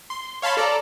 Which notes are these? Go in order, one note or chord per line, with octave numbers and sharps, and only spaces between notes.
C6
C#5 F5 A5 B5 C6
A4 D5 A#5